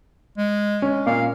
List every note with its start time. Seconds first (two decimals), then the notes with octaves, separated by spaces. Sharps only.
0.37 G#3
0.82 C#4
1.06 A#2 F5